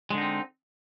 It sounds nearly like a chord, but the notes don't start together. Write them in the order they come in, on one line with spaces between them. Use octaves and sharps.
G#3 D3 D#4 C4